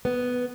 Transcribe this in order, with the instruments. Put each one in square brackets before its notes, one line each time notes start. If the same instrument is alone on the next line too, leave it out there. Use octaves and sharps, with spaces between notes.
[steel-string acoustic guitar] B3